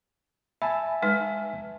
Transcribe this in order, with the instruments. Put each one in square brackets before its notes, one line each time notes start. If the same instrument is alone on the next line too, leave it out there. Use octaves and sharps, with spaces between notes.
[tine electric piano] E5 G#5 A5 [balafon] B5
[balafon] G#3 D#4 B4